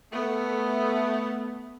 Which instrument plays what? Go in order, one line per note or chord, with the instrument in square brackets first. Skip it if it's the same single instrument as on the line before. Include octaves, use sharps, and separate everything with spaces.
[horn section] A3 [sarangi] B3